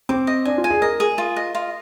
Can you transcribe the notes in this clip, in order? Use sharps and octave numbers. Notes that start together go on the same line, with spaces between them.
C4 D6
D#5
D4 G#5
F4
G#5
G#4
A#4 D#5
G#4
F4
D#5
F4